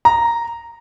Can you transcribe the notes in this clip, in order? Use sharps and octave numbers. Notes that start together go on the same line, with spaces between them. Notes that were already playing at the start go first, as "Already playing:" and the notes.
A#5